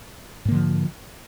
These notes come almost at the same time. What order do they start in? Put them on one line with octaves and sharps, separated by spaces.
G#2 A#3 D3 F3